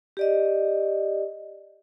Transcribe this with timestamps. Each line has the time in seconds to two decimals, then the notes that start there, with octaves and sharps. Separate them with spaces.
0.17 G4 D5 D#5